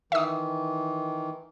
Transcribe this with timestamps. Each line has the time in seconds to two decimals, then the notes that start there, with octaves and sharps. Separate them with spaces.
0.12 D#3 E3 E5 D#6